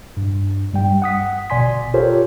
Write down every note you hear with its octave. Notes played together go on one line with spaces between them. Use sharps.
G2
G2 G3 G5
F#5 D#6 B6
G1 B2 D5 G#5 C6 B6
F4 G4 A4 A#4 C5 C#5